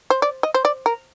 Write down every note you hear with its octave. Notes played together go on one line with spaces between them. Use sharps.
C5
D5
D#5
C5
D5
A#4